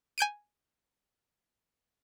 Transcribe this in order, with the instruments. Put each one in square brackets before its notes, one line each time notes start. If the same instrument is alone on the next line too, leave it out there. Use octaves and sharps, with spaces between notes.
[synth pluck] G#5 G6 D7 D#7